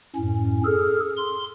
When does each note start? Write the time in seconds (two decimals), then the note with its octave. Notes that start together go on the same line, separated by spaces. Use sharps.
0.16 F#2 A2 C#4
0.65 G#4 A4 F6
1.17 C6